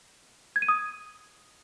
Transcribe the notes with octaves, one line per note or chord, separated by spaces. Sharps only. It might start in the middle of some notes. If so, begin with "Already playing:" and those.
G#6
D#7
D#6